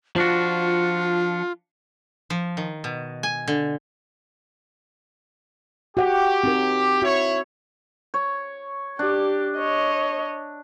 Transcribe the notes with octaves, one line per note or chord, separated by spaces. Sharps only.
F3 D4 F4 F#4
F3
D#3
B2
G#5
D3
F#4 G4 F#5
C4 D#4 A#4
E4 F#4 C#5
C#5
D4 G4
C#5 D#5